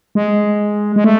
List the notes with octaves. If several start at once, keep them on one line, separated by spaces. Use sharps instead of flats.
G#3
G#3
A3